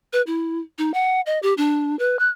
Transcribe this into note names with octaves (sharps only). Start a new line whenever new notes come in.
B4
E4
D#4
F#5
D#5
G4
D4
B4
F#6